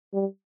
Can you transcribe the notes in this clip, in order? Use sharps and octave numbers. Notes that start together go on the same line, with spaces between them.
G3